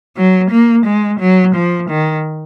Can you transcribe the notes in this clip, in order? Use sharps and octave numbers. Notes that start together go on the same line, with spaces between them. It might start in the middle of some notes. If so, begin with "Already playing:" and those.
F#3
A#3
G#3
F#3
F3
D#3